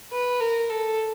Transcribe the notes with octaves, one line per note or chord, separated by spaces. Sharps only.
B4
A#4
A4